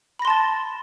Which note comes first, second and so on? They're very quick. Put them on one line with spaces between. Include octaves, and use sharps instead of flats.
B5 A#6 C6 A5 A6